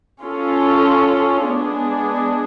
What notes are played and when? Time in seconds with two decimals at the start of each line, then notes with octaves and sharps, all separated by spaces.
0.22 C#4 F4 A4
1.46 G#3 B3 D4 G#4